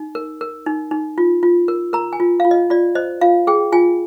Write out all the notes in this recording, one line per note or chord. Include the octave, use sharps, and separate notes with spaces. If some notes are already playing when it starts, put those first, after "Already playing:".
Already playing: D#4
A#4
A#4
D#4
D#4
F4
F4
A#4
A#4 A#5
G#5
F4
F4 F5
D#5
F4 D5
C5 D#5
F4 F5
G#4 G5
F4 G#5